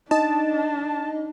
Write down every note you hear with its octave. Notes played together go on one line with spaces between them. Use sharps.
D4 D#4 D#5 A5